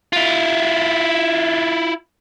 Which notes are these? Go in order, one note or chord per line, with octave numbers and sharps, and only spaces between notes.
E4 F4